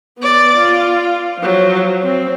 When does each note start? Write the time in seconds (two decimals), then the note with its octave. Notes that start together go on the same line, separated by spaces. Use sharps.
0.19 B3 D5
0.57 F4
1.38 F3 F#3
2.04 C4